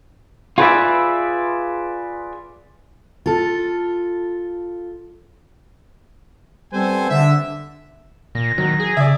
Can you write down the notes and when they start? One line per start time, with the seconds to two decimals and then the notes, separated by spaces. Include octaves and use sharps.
0.58 F4 G#4 B4 C#5 D5 E5
3.26 F4 A4
6.73 G3 B3 C4 A4 C5 G#5
7.10 D3 E5
8.35 A#2 A#6
8.58 D#3 F#3
8.80 G#4
8.97 C#3 D5 E5